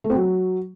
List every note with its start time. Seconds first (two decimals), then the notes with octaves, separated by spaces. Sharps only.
0.04 A3
0.10 C4
0.15 F#3